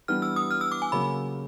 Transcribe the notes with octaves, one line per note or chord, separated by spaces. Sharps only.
E3 G3 B3 D4 G4 F6
E6
D#6
F6
E6
D6
G#5
C#3 F#3 A#3 B5